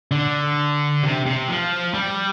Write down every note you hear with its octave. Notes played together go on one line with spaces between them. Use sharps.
D3
C3
C3
F3
G3